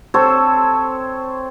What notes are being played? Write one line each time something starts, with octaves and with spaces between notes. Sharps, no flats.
C4 A4 C5 C#5